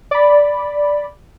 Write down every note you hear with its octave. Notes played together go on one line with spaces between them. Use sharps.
D5 B5